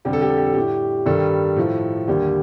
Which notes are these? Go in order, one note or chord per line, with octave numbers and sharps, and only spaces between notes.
F2 D3 G3 G4
A4
G4
A4
G4
A4
A2 G3 G4
G2 D#3 G3 A4
A2 F3
D#2 D3 G3 G4